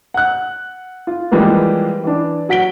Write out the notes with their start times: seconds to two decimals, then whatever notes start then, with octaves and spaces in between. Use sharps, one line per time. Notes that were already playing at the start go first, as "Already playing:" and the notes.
0.14 F#5 F#6
1.07 F4
1.31 E3 F3 G3 G#3 A#3 B3
2.04 E3 D4
2.49 F#3 F#5 B6 D7 G7